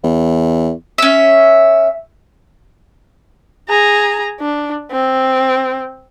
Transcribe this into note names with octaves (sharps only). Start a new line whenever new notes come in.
E2
C#4 E5
G#4 A#5
D4
C4